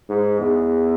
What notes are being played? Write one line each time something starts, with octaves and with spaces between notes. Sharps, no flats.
G#2
E2